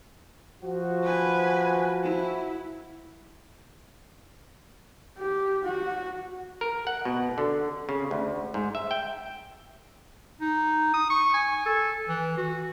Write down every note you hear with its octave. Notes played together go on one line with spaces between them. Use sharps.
F3 F#4
B4 G#5
E4
G4
F#4
A#4
F#5
B2
D3
C#3
D2
G#2
E5
G5
D#4
D#6
C#6
G#5
A4
E3
F#4